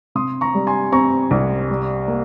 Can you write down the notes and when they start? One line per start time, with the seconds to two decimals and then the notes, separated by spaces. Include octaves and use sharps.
0.15 C3 C6 D#6
0.41 A#5 C#6
0.55 G3
0.67 G#5 C6
0.92 C4 A#5 C#6
1.31 C2
1.70 G3
2.08 A#3